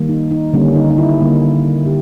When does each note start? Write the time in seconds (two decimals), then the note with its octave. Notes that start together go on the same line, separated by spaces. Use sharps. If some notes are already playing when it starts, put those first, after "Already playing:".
Already playing: D#3 G3 A#3
0.09 D#4
0.31 D#4
0.54 D3 G3 A#3 C#4
0.76 D#4
0.91 D#4
0.98 E4
1.20 D3 G3 A#3
1.86 D3 G4